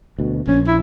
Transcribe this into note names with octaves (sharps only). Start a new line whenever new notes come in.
D2 B2
A#1 C#4
E4